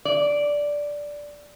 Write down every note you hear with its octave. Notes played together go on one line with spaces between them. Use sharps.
D5